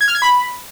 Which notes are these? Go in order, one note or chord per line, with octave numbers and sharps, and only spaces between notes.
G#6
F6
G#6
B5